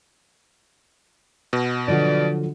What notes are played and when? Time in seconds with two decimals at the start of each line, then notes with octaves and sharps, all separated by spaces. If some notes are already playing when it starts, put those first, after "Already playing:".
1.53 B2
1.88 D3 F3 F#3 D5